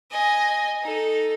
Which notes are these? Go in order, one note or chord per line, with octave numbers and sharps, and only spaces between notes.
D#5 G#5
D#4 A4